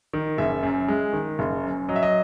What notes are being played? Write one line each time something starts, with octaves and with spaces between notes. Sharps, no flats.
D#3
F#1 E5
F#2
G#3
D#3
F#1
F#2
F#3 D#5
E5
D#5